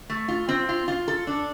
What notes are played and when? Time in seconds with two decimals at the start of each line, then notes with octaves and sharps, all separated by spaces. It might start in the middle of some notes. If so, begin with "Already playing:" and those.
0.10 A3
0.28 F4
0.49 C4
0.69 F4
0.88 F4
1.08 A4
1.27 D4